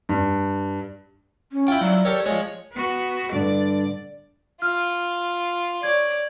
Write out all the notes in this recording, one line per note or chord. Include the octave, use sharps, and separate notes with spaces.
G2
C#4
E4 F4 G5
F#3 D5
G4 A4 A#4 C#5
F3 G#3 C#5
B3 F#4
G2 D3 D5
F4 F6
C#5 D5 G#6